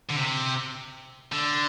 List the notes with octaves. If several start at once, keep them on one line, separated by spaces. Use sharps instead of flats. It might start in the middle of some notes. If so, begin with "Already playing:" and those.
D3
C3
D3